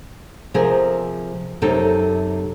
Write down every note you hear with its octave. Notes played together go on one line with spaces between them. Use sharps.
C3 F3 G#4 A#4
F#2 C3 D#4 G4 A4 C#5